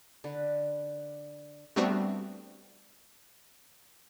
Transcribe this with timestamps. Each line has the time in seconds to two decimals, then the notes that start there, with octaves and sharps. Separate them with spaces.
0.24 D3 B4
1.76 G3 A3 B3 C4 D4 F#4